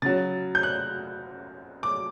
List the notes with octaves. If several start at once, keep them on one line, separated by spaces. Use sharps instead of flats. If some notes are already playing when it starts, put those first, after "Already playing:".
C#3 F#3 A6
G6
F#6
D6